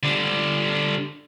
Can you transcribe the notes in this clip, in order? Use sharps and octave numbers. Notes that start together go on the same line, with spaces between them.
D3 G3